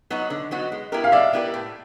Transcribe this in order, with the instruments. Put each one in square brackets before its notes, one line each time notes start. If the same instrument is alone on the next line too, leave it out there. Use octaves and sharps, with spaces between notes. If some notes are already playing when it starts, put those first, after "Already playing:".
[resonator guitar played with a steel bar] F#3 B3 D#4 F#4
D3
F#3 B3 D#4 F#4
G#3
B3 E4 G4 A#4
[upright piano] F5
[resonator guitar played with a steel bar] G#3 [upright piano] D5 E5
[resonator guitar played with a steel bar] B3 E4 G4 A#4
A2